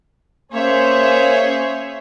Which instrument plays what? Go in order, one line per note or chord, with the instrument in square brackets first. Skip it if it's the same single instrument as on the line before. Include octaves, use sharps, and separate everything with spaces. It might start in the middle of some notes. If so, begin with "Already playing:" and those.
[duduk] A#3 [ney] C#4 [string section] G#4 C#5 E5 [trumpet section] C5